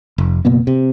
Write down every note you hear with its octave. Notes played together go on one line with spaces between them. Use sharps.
F1
F#1 B2 A#3 B3
C3